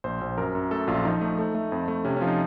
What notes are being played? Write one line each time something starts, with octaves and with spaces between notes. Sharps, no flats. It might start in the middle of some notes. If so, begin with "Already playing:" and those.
A#1 C5
A#1
F#2 A#4
F#2
A3 A4
A#1 F4
F3 D#4
A3
A3
A3
F2
A3
C3 C#4
C#4
F3 F4
D#4